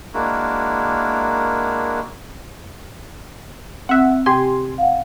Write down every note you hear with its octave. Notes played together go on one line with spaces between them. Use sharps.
G#3 A#3 D4 E4 F#4 A#4
C4 E5 F#5
C3 G4 G#5 C6
F5 F#5